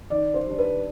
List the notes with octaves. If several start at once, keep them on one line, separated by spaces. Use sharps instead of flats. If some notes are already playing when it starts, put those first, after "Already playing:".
D#3 D5
C5
G3 D4
B4